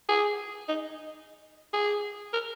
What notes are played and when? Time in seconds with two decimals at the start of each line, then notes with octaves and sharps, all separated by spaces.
0.09 G#4
0.68 D#4
1.73 G#4
2.33 A#4